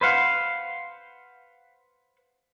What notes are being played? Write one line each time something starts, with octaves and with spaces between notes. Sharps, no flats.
B4 C5 F5 F#5